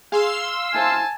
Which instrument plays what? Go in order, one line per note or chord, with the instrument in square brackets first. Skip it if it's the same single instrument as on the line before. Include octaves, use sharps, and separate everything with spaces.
[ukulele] G#4 [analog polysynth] F5 C6 E6
[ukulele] E4 C5 [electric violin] G#5 A5